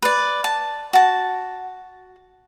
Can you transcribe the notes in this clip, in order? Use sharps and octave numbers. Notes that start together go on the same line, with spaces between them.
B4 D5
A5
F#4 A5